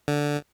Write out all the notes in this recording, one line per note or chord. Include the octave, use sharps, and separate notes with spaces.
D3